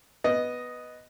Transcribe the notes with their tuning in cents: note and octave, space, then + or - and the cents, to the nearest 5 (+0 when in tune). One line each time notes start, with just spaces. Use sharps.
B3 +0 D#5 +0